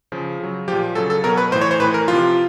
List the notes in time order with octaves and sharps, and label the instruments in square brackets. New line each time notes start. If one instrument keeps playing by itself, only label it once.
[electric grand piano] C#3 F3
C#3 F#3
F3 G4
A#2
F#3 A4
C#3
A4
B2 F#3 A#4
B4
A2 C5
E3
C#5
C5
A2 E3 B4
A#4
C3 F3 F4